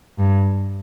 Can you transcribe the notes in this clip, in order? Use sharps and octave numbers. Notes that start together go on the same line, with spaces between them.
G2